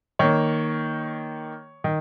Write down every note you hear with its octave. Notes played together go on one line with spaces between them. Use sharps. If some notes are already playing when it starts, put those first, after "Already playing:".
D#3 A#3 C#5
D#3